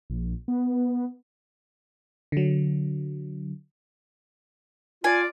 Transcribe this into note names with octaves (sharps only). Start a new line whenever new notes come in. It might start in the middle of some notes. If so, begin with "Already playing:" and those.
A#1
B3
D3 F#3
F4 D5 G#5